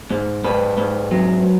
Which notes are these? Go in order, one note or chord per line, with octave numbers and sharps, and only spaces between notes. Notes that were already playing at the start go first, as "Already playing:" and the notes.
G#2
G#2 B4
G#2
F#3